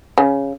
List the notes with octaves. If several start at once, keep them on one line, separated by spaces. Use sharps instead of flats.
C#3